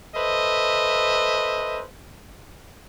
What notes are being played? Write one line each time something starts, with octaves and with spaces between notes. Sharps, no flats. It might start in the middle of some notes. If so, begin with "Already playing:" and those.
A4 B4 C5 D#5 E5